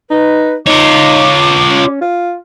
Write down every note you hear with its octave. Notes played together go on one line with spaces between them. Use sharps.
D#4 B4
D#4 F4 C#5 D6
C#4
F4